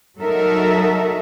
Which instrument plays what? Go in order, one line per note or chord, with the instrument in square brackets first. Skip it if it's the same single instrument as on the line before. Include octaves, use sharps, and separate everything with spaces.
[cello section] F#3 D#4 F#4 A4 A#4 E5